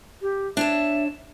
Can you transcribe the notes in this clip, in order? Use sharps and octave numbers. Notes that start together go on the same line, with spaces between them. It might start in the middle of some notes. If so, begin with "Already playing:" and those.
G4
D4 C#5 E5 A5